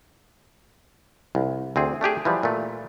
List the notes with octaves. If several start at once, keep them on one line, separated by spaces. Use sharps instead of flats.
C2
D2 C4 G#4
A3 D4 G4 G#4
E3 F3 G3
A#2 A3